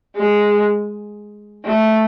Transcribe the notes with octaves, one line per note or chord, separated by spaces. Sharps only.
G#3
A3